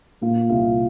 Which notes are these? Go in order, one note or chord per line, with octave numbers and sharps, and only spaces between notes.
A#2 F4
C2 F4